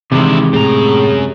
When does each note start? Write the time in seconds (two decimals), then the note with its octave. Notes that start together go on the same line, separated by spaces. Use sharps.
0.12 D2 C3 D#3 E3 G#3 E4
0.53 F#2 A2 G#4 A#5